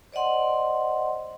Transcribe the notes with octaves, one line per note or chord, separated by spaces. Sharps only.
C5 D5 D#5 F#5 C6